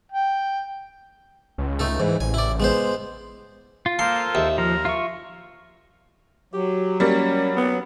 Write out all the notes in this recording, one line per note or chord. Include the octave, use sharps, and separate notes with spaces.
G5
C#2
A3 D#4 A4
G#2 E3
A1 G#5
E4 D5
G#3 B3 C5
F4
A#3 F4 A4 A#4 C5 C6
D#2 E5
F3 A#4 A#5
F4 E5 C#6
F#3 G4
G3 A#3 C#4
B3